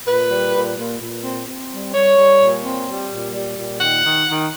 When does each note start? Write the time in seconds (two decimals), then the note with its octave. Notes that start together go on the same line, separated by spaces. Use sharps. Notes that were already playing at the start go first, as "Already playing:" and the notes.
0.07 A#2 B4
0.31 G3
0.54 A#2
0.77 A#2
1.00 A#2
1.24 C4
1.47 C4
1.70 G3
1.94 G3 C#5
2.17 G3
2.40 A#2
2.64 C4
2.87 G3
3.11 A#2
3.34 G3
3.57 A#2
3.80 D#3 F#5
4.04 D#3
4.28 D#3